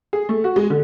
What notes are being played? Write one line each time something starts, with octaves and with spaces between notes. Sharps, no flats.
G#4
A3
F#4
G#3
D3